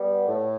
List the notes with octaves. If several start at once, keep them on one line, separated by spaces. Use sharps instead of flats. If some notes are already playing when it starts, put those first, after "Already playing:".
Already playing: G3 B3
A2